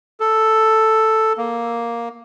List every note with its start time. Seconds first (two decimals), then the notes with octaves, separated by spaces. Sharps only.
0.20 A4
1.38 A#3